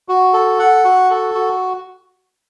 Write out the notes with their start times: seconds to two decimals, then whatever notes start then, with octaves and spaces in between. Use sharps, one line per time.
0.09 F#4
0.33 A4
0.59 F#5
0.85 F#4
1.10 A4
1.34 F#4